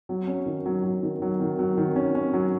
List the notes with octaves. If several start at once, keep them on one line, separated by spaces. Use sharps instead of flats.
F#3
C#4
D#3
F#3
F#3
D#3
F#3
D#3
F#3
D#3
C#4
C#4
F#3